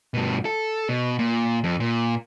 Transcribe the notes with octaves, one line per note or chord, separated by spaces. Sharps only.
G2 B2
A4
B2
A#2
F2
A#2